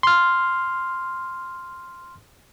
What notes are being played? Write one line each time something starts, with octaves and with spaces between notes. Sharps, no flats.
C6 F6